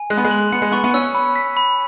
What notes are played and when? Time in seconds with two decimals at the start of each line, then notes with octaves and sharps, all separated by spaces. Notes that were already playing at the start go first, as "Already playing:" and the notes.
Already playing: G#5
0.10 G#3 F#6
0.17 B3
0.24 G#3
0.31 F#7
0.52 B3 C#7
0.62 G#3
0.72 B3 C#6
0.84 B3
0.94 C#4 E6
1.15 B5
1.36 B6
1.57 B5